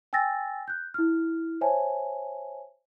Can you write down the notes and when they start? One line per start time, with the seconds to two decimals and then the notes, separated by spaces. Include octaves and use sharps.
0.13 G5 G#5 E6 A6 A#6
0.68 F#6 G6
0.94 E4 F6
1.61 C5 C#5 E5 G#5 A5